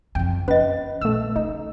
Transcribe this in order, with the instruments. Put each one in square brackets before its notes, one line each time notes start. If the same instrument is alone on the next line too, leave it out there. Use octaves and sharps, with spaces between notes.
[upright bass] F#1 F2 [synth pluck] G5
[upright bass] F3 [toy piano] C#4 D#5 [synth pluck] B4
[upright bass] A#1 [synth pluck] A3 E6
[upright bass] C#3 [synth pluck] D#4